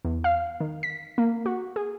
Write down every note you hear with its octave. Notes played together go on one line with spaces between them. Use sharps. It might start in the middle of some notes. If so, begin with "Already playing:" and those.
E2
F5
D#3
B6
A#3
F#4
G#4